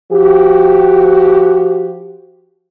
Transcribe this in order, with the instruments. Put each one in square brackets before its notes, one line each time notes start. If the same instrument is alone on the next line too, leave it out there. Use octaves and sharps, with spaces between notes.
[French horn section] F3 F#4 G4